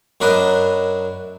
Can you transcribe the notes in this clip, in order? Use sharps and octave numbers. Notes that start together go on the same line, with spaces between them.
F#2 F#3 D4 A#4 B4 D#5